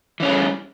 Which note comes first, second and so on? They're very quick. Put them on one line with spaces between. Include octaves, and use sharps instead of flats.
E3 C#4 G#4 G3